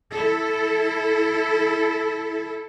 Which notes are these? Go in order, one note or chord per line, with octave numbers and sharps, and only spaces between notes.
E4 A4